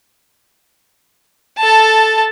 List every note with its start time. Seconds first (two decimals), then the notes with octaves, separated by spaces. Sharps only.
1.58 A4 A5